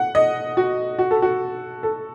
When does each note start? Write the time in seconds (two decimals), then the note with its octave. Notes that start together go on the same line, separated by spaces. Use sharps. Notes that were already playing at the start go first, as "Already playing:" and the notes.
Already playing: F#5
0.15 D#5
0.57 F#4
0.99 F#4
1.11 A4
1.22 F#4
1.83 A4